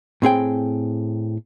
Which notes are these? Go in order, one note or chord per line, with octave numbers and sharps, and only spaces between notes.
A2 C4 G#4 G5